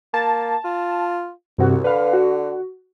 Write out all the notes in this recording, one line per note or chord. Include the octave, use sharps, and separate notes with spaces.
A#3 A5
F4
C2 G2 C3 F#4
D3 B4 F5
F#4